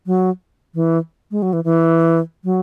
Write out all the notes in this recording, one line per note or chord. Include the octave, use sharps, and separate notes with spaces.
F#3
E3
G#3
F#3
E3
E3
F#3